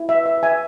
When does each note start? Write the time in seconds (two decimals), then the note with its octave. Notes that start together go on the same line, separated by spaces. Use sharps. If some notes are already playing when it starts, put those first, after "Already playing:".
Already playing: E4
0.09 E5
0.15 B4
0.26 E5
0.37 B4
0.43 E5 G#5